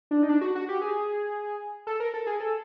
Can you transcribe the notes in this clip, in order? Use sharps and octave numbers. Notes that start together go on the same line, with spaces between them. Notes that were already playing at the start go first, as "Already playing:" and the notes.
D4
D#4
D4
F#4
F#4
G4
G#4
A4
A#4
A4
G#4
A4